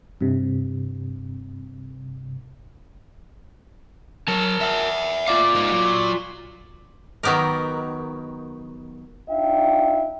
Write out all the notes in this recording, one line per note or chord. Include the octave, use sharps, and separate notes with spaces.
G2 C3
F#3 A#4 A5
E5 F#5
F4 D5 F5 D6
G#2 D#4
F#3
D#3 F#3 B3 G4 A#4
D4 D#4 F4 E5 F5 G5